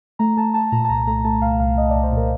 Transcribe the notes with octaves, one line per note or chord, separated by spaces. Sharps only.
A3 A#5
A3 A5
A3 A5
A#2 A#5
A5
C2 A#5
A3 A#5
A3 A5
C2 F5
C2 F5
C2 D#5
D5
C2
C5
A#2 A#4